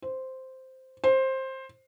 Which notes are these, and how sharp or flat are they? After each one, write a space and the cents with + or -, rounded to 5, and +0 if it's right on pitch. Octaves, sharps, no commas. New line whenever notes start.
C5 -5
C5 +15